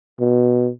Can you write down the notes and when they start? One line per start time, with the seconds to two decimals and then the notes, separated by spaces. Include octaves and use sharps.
0.20 B2